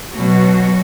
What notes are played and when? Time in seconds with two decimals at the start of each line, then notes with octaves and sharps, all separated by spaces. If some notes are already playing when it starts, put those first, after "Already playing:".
0.13 B2 F#3 F#4